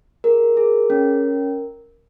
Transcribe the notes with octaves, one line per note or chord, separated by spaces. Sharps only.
G#4 A#4
G#4
C#4